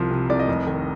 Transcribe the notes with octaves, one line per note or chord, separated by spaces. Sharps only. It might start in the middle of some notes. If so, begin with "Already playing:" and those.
Already playing: C2 F3
C3
C2 D5
D#5
F1
D#3